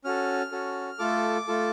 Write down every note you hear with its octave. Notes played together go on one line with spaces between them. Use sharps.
C#4 F#4 A4 F6
C#4 F#4 A4
A3 F4 A4 D6
A3 F4 A4